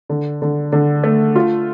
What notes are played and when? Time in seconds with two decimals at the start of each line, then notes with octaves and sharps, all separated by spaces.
0.09 D3
0.42 D3
0.72 D3
1.04 A3
1.35 F4